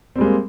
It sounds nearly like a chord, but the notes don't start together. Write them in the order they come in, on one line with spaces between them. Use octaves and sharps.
C4 G3 G#3 A#3